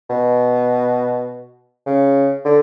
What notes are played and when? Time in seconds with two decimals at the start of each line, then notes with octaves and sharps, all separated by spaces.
0.09 B2
1.86 C#3
2.45 D3